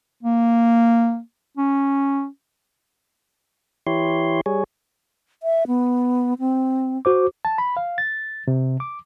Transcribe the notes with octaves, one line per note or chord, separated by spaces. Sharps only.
A#3
C#4
E3 E4 G4 C#5 C6
G3 G#4 C#5
E5
B3
C4
F#4 C5 D6
A5
B5
F5
A6
C3
D6